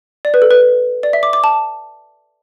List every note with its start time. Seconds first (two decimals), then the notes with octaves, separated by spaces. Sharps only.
0.25 D5
0.34 B4
0.42 A4
0.51 B4
1.03 D5
1.13 E5
1.23 D6
1.33 D6
1.44 A5